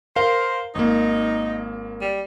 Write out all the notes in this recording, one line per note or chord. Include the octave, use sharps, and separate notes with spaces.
A#4 C5 F5
G#1 A#3 D#4
G3